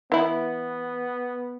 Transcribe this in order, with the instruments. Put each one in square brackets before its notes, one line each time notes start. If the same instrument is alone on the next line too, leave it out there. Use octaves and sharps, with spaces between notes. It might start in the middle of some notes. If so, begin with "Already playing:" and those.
[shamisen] E3 E4 [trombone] B3